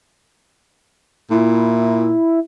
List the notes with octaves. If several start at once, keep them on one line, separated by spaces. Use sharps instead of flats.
A#2 E4